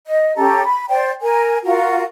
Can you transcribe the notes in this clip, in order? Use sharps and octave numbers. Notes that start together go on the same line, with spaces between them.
D#5
C#4 G4 A4 A#5
B5
C5 D5 G5
A#4 G#5
F4 F#4 A#4